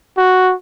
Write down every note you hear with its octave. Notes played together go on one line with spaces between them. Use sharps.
F#4